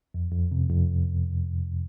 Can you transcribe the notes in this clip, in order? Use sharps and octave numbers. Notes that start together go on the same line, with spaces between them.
F2
F2
C3
F2